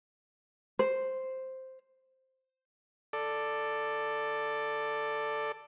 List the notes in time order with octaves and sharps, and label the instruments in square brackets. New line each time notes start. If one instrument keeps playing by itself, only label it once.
[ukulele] C5
[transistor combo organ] A4 D5